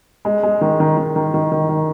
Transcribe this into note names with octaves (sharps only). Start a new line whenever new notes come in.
G#3
G#3
D#3
D#3
D#3
D#3
D#3
D#3
D#3